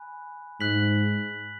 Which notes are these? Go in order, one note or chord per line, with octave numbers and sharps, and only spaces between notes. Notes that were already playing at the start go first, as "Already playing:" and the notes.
Already playing: G#5 B5 F#6
G#2 F#6 B6 F#7